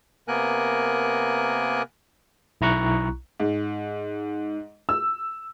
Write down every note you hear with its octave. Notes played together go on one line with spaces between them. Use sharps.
C3 A#3 B3 A#4 G#5 F#6
B1 E4 A#5 C#6 F#6
G#2
E6